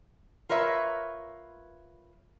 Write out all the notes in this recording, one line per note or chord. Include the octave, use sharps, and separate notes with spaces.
F4 A#4 B4 C#5 E5